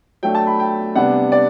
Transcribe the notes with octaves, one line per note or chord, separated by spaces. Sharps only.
F#3 A3 D4 G5
A5
B5
G5
C3 G3 B3 D4 F#5
D5